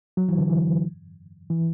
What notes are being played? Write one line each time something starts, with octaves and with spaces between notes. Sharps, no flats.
F#3
E3
D3
E3
E3